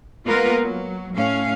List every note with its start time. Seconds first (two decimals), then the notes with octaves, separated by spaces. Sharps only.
0.25 G#3 A#3 B3 F4 A#4 B4
0.62 F#3
1.16 A2 C#4 F5